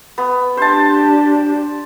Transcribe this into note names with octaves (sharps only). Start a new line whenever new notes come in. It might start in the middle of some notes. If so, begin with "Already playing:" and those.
B3
D4 G4 C5 A5